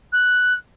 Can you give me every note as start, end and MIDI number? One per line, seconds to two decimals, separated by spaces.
0.12 0.54 90